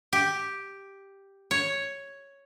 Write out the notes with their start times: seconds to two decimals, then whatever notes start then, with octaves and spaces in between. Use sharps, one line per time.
0.13 G4
1.51 C#5